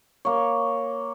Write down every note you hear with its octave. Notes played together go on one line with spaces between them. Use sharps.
A#3 C#5